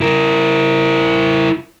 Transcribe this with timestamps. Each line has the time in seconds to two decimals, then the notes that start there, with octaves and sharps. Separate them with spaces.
0.01 E4 A#4